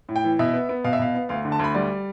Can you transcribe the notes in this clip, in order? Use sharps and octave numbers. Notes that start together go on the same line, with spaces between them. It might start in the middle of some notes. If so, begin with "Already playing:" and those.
A2
G5
E3
B2 E5
B3
B3
B2 F5
E5
B2 F5
B3
D2 F5
D3
A5
D2 B5
G3 D5